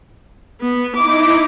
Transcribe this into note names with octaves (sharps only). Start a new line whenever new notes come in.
B3
D#4 E4 D6